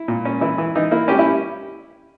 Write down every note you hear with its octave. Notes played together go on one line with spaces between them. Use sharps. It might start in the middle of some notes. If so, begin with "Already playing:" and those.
Already playing: E4
A#2
C#4
E3 E4
E3
E3 D#4
A#3 E4
C#4 G4
E4